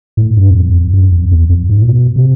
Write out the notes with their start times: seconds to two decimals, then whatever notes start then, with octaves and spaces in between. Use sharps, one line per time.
0.17 A2
0.37 G2
0.51 E2
0.56 F2
0.74 F2
0.93 F#2
1.12 F2
1.31 E2
1.50 F2
1.69 G#2
1.82 A#2
1.87 B2
2.16 C3